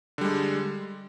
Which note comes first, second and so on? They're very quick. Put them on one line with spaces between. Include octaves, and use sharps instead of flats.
D3 G3 G#3